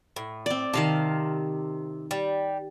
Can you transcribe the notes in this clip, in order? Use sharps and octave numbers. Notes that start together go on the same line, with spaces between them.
A2
C4 D5
C3 D#3 F5 A5
G3